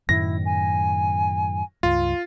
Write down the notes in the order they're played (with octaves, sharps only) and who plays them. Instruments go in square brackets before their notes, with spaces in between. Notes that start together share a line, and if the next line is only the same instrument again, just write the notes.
[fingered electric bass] F#2 A2 D#3 [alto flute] E4 [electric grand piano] A#6
[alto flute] G#5
[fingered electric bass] C#2 G2 [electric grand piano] F4